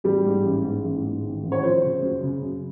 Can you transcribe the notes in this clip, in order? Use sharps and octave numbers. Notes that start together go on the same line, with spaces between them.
A1 G3 G4
G#2
A1
G#2
A1
G#2
D#3
A1
C#5
F3 C4 C5
C#3
F#2
C#3
F#2